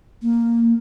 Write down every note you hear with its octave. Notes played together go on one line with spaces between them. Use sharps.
A#3